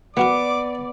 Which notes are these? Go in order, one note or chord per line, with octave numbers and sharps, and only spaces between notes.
E3 B3 F#4 A#4 D5 D6